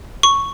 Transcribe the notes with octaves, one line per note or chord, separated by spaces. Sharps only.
C#6